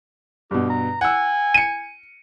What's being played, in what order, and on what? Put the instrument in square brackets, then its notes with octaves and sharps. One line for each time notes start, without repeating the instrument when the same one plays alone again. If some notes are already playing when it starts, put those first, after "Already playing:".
[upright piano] G2 B2 [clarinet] G4
[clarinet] A#5
[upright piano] F#5 E6 [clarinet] G#5
[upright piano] C#7 D#7